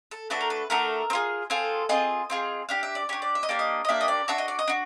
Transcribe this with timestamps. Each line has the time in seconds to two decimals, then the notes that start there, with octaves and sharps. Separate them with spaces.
0.11 A4
0.30 A3 D4 F#4 A4 B4
0.41 A#4
0.50 B4
0.70 A3 D4 F#4 A4 A#4
1.10 C4
1.13 F4 G#4
1.50 C4 F4 G#4 A4
1.89 C4 F4 G#4 D#5
2.30 C4 F4 G#4
2.69 D4 G4 F5
2.83 E5
2.95 D5
3.09 D4 G4 C#5
3.22 D5
3.35 E5
3.43 D#5
3.49 A#3 D4 G4 D5
3.59 D#5
3.85 D#5
3.89 A#3 D4 G4 E5
4.01 D#5
4.08 D5
4.28 D4 F#4 A4 E5
4.38 D#5
4.48 D5
4.59 D#5
4.68 D4 F#4